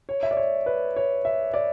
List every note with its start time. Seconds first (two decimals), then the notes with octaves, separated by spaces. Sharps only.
0.09 C#5
0.23 E5
0.31 D5
0.37 C#5
0.66 B4
0.96 C#5
1.25 E5
1.54 D5